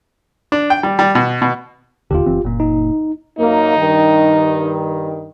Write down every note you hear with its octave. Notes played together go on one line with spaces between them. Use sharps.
D4
G5
G3
G3
B2
B2
D#1 D#2 D3 F4 G4
F#1 E3 C4
F#1 A#2
D#4
F#2 A#3 D#4
G2 D#3